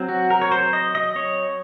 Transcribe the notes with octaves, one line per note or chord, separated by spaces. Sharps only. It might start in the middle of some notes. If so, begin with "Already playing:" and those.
Already playing: F#3 C4
F#4
A#4
C#5
C5
D#5
D#5
C#5